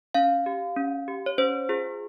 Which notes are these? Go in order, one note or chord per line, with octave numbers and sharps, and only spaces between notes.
C#4 F5
G4
C#4
G4
C#5
C#4 C5
F4 G#4